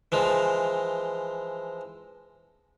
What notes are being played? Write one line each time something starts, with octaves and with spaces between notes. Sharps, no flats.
E3 F3 G#3